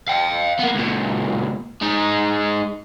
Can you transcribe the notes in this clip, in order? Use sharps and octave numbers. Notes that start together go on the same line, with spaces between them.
F5 G5
A#3 B3
C#2 A#2
G#3 D#4